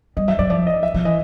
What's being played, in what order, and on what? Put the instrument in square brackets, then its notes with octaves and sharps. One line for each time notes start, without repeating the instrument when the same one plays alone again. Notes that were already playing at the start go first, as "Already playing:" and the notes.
[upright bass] G3 [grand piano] D#5
[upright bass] F#3 [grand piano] E5
[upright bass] F#3 [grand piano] D5
[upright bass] F3 [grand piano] D5
[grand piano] D#5
E5
[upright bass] F3
[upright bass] E3 [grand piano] D#5